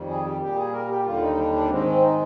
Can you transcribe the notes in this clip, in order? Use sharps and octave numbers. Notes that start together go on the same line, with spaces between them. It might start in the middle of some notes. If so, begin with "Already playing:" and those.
Already playing: F2 D#3 G3
G#4
G4
A#2 G3 G4
G#4
A#4
G4
D#2 D3 G3 F4
D#4
D4
D4
G#2 D#3 G#3 C4
C4
D#4